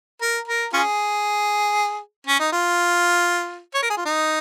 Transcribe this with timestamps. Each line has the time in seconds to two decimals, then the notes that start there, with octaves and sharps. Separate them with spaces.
0.22 A#4
0.48 A#4
0.73 C#4 F4 G#4
2.27 C#4
2.40 D#4
2.53 F4
3.74 C#5
3.82 A#4
3.90 G#4
3.97 F4
4.05 D#4